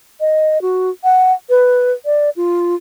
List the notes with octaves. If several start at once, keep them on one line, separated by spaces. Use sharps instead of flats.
D#5
F#4
F#5
B4
D5
F4